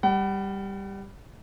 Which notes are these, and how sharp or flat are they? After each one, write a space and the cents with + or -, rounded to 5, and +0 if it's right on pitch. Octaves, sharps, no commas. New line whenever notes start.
G3 +10 F#5 +40